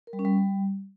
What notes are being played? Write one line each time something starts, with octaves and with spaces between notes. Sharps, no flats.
A#4
G3
C#4
G3